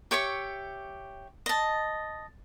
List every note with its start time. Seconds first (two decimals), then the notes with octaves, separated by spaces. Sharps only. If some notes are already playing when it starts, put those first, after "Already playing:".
0.11 G4 C#5 E5 C#6
1.46 D#5 A5